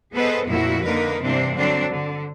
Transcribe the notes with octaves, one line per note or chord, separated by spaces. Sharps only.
B3 G#4 A4 B4 C5 D#5
F2 A#2 F3 A3 E4 F#4
D3 A#3 D#4 A#4 B4
G2 C3 E3 A#3 C4 D4
D3 F#3 C4 D4
D3